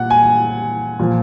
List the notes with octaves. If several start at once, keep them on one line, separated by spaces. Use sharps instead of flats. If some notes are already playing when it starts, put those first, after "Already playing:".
Already playing: A#2 F#5
G#5
A#2 F3